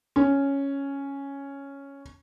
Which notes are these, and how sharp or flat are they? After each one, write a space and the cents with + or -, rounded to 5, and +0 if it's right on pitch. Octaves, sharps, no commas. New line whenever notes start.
C#4 +0